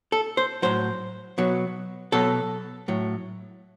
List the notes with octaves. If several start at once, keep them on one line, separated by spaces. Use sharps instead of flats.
A4
C5
A2 F#3 C5
B2 F#3
B2 F#3 A4
A2 F#3